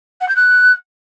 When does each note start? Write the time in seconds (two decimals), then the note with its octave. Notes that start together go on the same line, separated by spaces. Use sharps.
0.21 F#5
0.28 G6
0.36 F#6